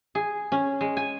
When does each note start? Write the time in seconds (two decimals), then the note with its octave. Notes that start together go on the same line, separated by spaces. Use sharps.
0.15 G#4
0.52 C#4
0.81 G#3
0.97 G#5